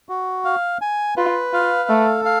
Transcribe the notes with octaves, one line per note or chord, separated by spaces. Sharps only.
F#4
F5
G#5
F4 B4
F4 F5
A3 A4
F5